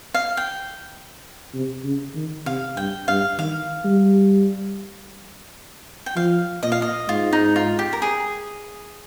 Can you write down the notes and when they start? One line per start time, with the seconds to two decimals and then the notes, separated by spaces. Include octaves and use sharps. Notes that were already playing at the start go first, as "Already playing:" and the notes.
0.14 F5
0.37 G5
1.54 C3
1.84 C#3
2.15 D#3
2.46 C3 F5
2.77 G2 G5
3.08 G2 F5
3.38 D#3 F5
3.85 G3
6.06 G5
6.16 F3 F5
6.63 A#2 D#5
6.72 F5
6.82 D#5
7.09 G#2 F4
7.33 D#4
7.56 F4
7.79 G4
7.93 A#4
8.02 G#4